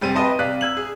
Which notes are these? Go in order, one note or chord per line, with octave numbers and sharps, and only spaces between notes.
F1 G3 C4 D#7
B4 D#5 G5 A5 C6
C3 D5 F5 F#6 B6
E6 G#6 F#7
G#4